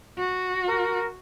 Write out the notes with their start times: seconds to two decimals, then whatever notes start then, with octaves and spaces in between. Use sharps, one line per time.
0.19 F#4
0.68 A#4